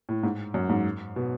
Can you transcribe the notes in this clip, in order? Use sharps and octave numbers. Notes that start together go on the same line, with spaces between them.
A2
G#2
F#2
G#2
B2